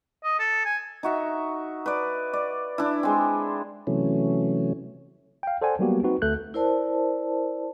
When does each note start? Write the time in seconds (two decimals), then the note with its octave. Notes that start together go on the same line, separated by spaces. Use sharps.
0.24 D#5
0.39 A4
0.65 G#5
1.03 D#4 F#4 E5
1.86 B4 D5
2.33 D5
2.78 D4 E4
3.03 G#3 C4
3.87 C3 E3 F#3 A3 C#4
5.43 F5 G5
5.61 A4 C5 D5 F#5 G#5
5.79 F#3 G3 A#3 B3 F#4 G4
6.03 C4 D#4 F#4 B4
6.22 D2 A3 A4 F#6 G6
6.54 E4 A#4 C5 D5 A5